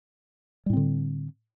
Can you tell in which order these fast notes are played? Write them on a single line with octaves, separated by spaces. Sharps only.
G3 A2 C4 D3